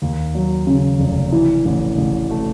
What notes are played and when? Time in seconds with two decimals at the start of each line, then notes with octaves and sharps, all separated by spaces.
0.02 D#2
0.35 F#3
0.67 C#3
0.99 F1
1.32 E3
1.65 A1
1.98 A1
2.30 A3